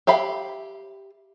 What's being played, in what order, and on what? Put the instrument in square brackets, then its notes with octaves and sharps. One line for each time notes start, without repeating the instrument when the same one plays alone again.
[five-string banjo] G4 E5 F5 B5